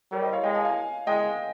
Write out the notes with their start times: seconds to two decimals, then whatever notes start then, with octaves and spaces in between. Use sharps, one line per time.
0.12 G3 A#4 C#5
0.22 C5 D#5
0.33 C#5 F5
0.43 G#3 D#5 G5
0.55 F5 G#5
0.65 F5 G#5
1.07 G#3 D#5 G5